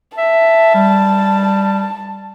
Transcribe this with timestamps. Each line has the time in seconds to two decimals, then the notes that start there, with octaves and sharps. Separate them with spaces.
0.18 E5 A5
0.75 G3